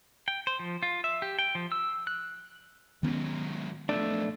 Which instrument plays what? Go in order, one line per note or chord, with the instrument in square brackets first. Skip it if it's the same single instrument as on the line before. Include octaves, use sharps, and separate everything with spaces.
[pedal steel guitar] G5
C5
F3
F4
E5
G4
G5
F3
E6
F#6
[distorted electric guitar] G#2 F#3 [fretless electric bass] D#3 B3 C#4
[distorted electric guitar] B1 F2 [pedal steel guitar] A3 [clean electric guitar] D4